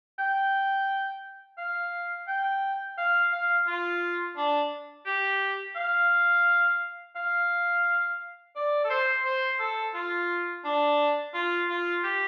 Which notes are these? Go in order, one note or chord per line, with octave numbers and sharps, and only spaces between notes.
G5
F5
G5
F5
F5
F4
D4
G4
F5
F5
D5
A4
C5
C5
A4
F4
D4
F4
F4
G4